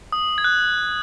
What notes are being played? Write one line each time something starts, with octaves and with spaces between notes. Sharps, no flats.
D#6
G#6
F#6